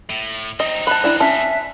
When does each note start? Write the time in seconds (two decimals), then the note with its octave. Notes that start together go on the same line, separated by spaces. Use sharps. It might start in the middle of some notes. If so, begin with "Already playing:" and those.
0.10 A2
0.60 C4 D#4 D#5
0.87 A5 B5 F#6
1.04 D4 E4
1.20 C#4 E5 G#5 A5